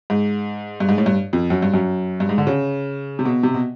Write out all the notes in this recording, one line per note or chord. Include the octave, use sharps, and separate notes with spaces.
G#2
G2
G#2
A2
G2
F2
F#2
G2
F#2
G2
G#2
D3
C#3
C3
B2
C3
B2